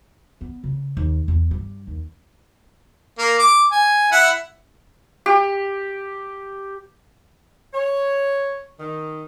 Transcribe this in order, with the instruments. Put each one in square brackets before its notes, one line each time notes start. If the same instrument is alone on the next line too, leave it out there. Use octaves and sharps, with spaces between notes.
[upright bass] B3
C#3
D#2
E2
G2
D#2
[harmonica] A#3
D6
G#5
E4 F#5
[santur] G4
[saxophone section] C#5
D#3